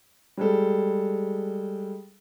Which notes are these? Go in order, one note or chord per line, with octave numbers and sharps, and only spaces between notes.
G3 G#3 A4